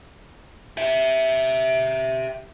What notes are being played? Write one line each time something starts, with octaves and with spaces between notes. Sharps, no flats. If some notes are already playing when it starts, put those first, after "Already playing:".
G4 E5